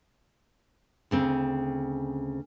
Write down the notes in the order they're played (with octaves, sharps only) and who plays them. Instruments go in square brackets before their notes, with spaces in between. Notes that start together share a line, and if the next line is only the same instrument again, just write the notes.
[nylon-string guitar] D2 C#3 C4